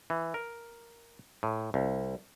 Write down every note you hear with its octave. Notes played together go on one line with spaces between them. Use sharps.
E3
A#4
A2
C2